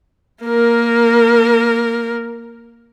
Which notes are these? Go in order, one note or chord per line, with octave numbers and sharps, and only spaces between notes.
A#3 A#4